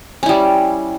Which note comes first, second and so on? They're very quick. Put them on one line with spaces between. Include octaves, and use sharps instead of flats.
C#4 E4 G3